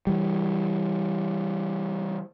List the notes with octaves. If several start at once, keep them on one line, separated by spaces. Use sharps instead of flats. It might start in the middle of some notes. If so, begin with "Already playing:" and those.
E3 G3